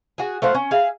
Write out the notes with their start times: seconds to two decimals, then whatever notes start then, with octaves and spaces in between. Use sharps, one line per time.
0.18 F#4 G#4
0.42 A3 F4 C5 F#5
0.55 C#4
0.71 G#4 E5 F5